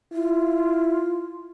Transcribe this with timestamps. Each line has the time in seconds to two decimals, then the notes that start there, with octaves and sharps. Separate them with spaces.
0.13 E4 F4